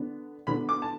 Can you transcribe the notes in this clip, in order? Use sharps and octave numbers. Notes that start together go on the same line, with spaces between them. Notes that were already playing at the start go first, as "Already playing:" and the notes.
Already playing: D3 B3 D4
D3 B3 D4 B5
D6
A5